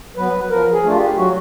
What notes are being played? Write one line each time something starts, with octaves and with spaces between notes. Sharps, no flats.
F#3 B3 B4
F3 A#4
G#4
A3 D4 F4
G4
F#3 F#4